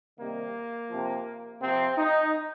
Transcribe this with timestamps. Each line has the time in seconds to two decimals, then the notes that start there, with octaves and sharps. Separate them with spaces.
0.18 C3 D#3 G3 A#3
0.89 C3 F3
1.61 C3 F3 C4
1.97 D#4